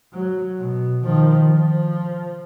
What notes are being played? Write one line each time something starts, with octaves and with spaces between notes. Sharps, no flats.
F#3
B2
D#3 F3
F3